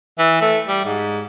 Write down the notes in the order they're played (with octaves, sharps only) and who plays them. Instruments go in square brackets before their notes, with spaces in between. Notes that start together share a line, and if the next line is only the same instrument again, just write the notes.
[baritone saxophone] E3
A3
G3
G#2